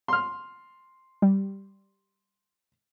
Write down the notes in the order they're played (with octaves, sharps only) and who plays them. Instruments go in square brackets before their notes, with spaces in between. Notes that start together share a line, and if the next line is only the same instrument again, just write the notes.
[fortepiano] C6 F6
[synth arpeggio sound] G3